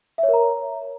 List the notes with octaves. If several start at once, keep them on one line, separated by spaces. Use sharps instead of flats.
E5
C#5
A#4
A#5